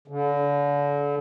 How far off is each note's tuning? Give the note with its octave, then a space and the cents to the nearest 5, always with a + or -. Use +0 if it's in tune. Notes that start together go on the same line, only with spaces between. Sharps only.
D3 -35